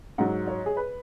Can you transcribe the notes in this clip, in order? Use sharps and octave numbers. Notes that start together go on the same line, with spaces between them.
G#2 F#3 F#5
C#5
G#4
B4